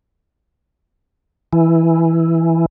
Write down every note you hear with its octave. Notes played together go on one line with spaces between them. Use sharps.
E3